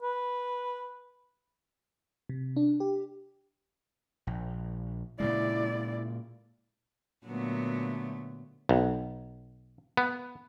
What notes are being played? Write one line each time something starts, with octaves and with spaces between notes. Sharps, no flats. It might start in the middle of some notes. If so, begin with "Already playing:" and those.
B4
C3
D4
G4
A#1
A#2 C#3 G#3 E4 D5
A#2 D3 F#3 A3 B3
B1
B3